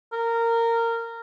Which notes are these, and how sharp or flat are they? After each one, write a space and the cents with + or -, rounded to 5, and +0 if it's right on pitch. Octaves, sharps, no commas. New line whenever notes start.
A#4 -15